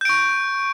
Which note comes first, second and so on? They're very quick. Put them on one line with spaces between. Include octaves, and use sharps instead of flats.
G6 D7 C#6